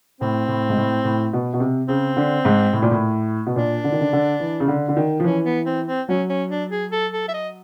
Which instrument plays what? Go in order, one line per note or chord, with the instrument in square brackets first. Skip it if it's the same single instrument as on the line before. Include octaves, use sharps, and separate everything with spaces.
[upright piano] A2 [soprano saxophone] C4
[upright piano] A2
G#2
A2
A2
B2
B2
C3
[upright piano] C#3 [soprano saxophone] C4
[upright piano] D3
G#2
A2
A#2
A2
B2
[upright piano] A#2 [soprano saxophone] D4
[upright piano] D3
D#3
D3
D3
E3
C#3
D3
D3
D#3
F3
[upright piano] E3 [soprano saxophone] C#4
[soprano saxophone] B3
C4
C4
[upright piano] F#3 [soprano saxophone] C#4
[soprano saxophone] C#4
D4
G#4
A4
A4
E5
D#5